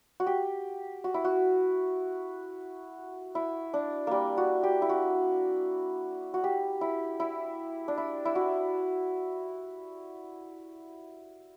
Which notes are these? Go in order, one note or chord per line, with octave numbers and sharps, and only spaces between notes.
F#4
G4
F#4
E4
F#4
E4
D4
G3 A#3
F#4
G4
E4
F#4
F#4
G4
E4
E4
D4
E4
E4
F#4